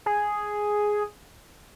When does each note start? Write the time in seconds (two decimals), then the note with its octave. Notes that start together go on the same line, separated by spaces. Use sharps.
0.06 G#4